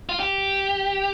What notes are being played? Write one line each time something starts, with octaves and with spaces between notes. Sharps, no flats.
F4
G4